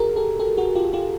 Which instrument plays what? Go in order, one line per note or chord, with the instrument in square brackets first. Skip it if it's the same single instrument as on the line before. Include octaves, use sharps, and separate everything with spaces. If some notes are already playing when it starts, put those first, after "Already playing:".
Already playing: [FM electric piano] F#4 G#4 A#4
G4 A4
G4 A4
F#4 G#4
F4 G4
F4 G4